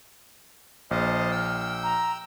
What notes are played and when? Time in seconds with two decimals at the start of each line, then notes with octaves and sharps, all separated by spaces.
0.91 A#1 C5 D#5 A5 F6
1.31 G5 E6
1.83 A#5